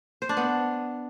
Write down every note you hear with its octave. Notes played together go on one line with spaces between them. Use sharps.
C5
D4
B3